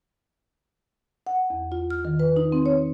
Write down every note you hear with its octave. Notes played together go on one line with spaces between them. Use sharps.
F#5
E2
F4
F6
D#3
B4
D#4
C4
C#5